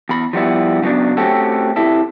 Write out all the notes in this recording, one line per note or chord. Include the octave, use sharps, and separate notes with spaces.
E2 B5
F3 G3 B3 E4
C#3 F#3 B3 D4
A3 C4 C#4 F#4 G4 A4
C3 E4 A4